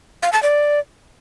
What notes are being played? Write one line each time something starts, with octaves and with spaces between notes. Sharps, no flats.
F5
A5
D5